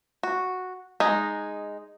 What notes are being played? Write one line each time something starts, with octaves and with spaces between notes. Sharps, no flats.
F#4
G#3 D#4